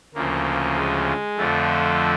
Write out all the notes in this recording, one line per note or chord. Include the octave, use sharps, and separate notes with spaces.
D2 C#3 F3 A#3
G#3
F2 D3 F3 A3